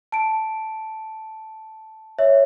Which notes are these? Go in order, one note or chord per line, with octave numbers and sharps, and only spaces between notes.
A5 D7
C#5 E5